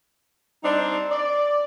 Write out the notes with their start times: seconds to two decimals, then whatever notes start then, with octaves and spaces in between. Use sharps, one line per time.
0.63 G3 C4 D4 D#4 C5
1.10 D5